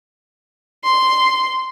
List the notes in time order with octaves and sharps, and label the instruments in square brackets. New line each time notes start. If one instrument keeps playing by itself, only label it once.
[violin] C6